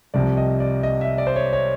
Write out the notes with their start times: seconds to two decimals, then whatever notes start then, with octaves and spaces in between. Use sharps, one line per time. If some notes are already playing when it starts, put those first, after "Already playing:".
0.14 C2 C3 F3 D5
0.37 D#5
0.60 D5
0.83 D#5
1.01 E5
1.18 D5
1.27 C5
1.36 C#5
1.53 C#5